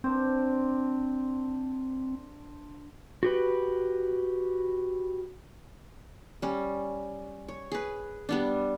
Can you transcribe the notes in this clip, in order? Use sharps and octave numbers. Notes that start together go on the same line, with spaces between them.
C4 D4 C5
F#4 G4 B4
G3 C#4
C#5
G#4 B4
G3 B3 D4